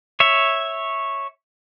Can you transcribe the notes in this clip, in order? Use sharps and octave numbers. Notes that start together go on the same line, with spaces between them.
C#5 E5